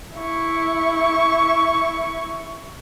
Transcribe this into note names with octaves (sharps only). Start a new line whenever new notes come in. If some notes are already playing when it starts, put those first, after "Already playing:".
E4 C#6